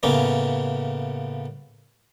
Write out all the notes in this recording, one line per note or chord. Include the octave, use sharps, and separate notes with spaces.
A2 C#3 A#3 B3 C#4